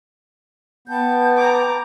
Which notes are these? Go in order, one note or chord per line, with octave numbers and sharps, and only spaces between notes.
B3 G5 A5 G6
A#5 D6